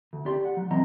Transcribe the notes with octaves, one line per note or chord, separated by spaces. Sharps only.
D2
G4 D5 C6
F#5
F#3
C#2 E3 C4 E4 D#5 A#5